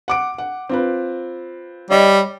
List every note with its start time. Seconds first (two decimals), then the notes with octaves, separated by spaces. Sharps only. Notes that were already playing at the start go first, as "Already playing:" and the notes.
0.08 F#5 D6 D7
0.38 F#5
0.69 C4 F4 B4
1.91 G3 C#5 D#5